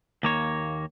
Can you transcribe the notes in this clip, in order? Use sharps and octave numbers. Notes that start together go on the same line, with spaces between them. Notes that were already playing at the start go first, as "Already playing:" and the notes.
D#2 A#3 C#5